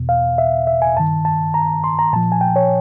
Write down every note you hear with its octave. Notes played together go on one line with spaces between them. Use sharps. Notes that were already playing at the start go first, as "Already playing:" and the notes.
Already playing: E2 B2
F5
E5
E5
G#5
G2 D#3 A5
A5
A#5
C6
A#5
A#2 F3 A5
G#5
G5
C#5